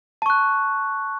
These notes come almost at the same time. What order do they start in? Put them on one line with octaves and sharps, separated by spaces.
A5 C#6 F#6